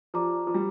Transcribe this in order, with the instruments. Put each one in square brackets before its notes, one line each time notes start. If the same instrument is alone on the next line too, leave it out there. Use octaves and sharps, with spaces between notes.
[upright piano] F3 [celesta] G4 D5 A#5 D6
[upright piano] F3
G3